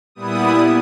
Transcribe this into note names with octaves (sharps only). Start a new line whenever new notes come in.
A#2 G3 B3 E4 D#6